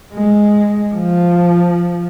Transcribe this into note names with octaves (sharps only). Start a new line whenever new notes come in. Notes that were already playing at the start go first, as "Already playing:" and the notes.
G#3
F3